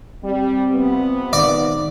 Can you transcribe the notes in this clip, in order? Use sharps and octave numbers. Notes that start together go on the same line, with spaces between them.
G3 C4
C3 F3 B3
D#3 D5